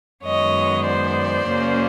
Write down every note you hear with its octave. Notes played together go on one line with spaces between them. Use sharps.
F#2 D#3 G#3 B3 C#5 D#5
C5 D5
F#2 C#3 F#3 A#3 C#4